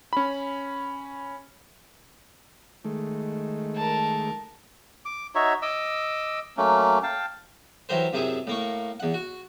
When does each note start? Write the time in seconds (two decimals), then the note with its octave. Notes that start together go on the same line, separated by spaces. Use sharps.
0.13 C#4 B5
2.85 D#3 G#3 A3
3.76 A#4 A5
5.05 D6
5.35 D#4 F#4 C#5 E5
5.62 D#5 D6 E6
6.57 F#3 A3 A#3 C#4
7.03 F5 G5 A5
7.89 E3 F#3 G4 A#4 C5
8.13 F#2 C3 E4 G#4
8.47 A2 A#3 C#6
9.00 E2 F#5
9.14 F#4